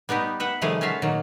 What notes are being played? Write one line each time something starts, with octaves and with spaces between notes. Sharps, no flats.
G3 B3 D#4 G4
B4 E5 F#5
C3 D#3 F3 G3 A3 G#4
C#4 F4 F#4 E5 F5
A#2 D#3 F#3 A#3